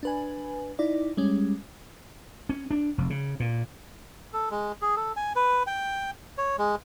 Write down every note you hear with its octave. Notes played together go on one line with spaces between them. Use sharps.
D4 B4 G#5
D#4 E4 D5
G3 G#3 C#4
C#4
D4
F1
C#3
A#2
A4
G#3
G#4
A4
G#5
B4
G5
C#5
G#3